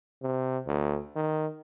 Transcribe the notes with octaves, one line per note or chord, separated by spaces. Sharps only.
C3
D2
D#3